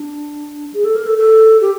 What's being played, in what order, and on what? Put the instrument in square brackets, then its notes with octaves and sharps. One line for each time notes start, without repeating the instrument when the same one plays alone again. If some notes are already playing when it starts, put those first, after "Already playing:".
Already playing: [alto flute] D4
G#4
A4
A#4
A4
A4
G4